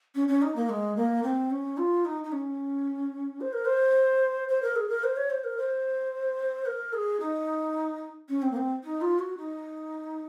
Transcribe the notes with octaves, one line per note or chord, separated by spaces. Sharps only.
C#4
C#4
D#4
A#3
G#3
A#3
C4
C#4
F4
D#4
D#4
C#4
C5
A#4
C5
C5
A#4
G#4
A#4
C5
C#5
C5
A#4
C5
A#4
G#4
D#4
C#4
C4
A#3
C4
D#4
F4
F#4
D#4